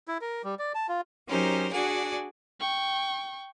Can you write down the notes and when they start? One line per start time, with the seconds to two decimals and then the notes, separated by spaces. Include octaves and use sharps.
0.08 E4
0.21 A#4
0.44 G3
0.59 D5
0.75 A5
0.89 F4
1.29 F#3 C#4 D#4 G4 A#4 C5
1.73 D4 F#4 G#4 D5 F#5 G#5
2.60 G5 C#6